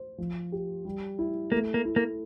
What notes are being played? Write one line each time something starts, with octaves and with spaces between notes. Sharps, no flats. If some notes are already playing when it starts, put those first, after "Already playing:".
Already playing: C5
F3
G4
G3
E4
A3 A#3
A#3
E4
A#3